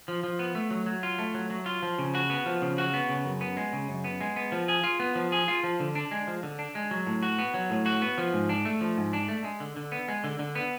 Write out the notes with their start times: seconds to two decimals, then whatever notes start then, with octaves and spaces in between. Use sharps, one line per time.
0.08 F3
0.24 F3
0.39 B3
0.55 A3
0.71 F#3
0.86 F#3
1.03 F4
1.19 A3
1.34 F#3
1.50 F#3
1.66 F4
1.82 F3
1.99 C#3
2.15 F#4
2.30 B3
2.46 F3
2.62 C#3
2.78 F#4
2.94 B3
3.09 C#3
3.25 F#2
3.41 B3
3.57 G#3
3.73 C#3
3.89 F#2
4.04 B3
4.21 G#3
4.36 B3
4.52 F3
4.68 G#4
4.84 F4
5.00 B3
5.15 F3
5.32 G#4
5.48 F4
5.63 F3
5.80 D3
5.95 D4
6.11 G#3
6.27 F3
6.43 D3
6.59 D4
6.75 G#3
6.91 F#3
7.06 A2
7.23 F#4
7.38 B3
7.54 F#3
7.70 A2
7.86 F#4
8.02 B3
8.18 F3
8.33 G#2
8.49 D4
8.65 A3
8.81 F3
8.97 G#2
9.13 D4
9.29 A3
9.44 G#3
9.60 D3
9.77 D3
9.92 B3
10.08 G#3
10.24 D3
10.39 D3
10.55 B3